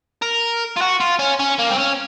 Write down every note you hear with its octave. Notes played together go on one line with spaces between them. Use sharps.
A#4
F4
F#4
F4
C#4
C#4
A#3
C4
C#4